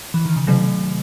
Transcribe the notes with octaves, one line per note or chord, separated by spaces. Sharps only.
E3
D#3
C#3
C3 D#3 F#3 A3